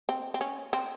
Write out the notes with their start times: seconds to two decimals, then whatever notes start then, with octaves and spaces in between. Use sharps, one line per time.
0.09 C4
0.34 C4
0.41 C#4
0.73 C4